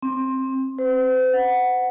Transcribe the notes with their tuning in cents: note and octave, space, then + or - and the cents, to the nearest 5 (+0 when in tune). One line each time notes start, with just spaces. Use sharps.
C4 +15
C5 -40
F#5 +0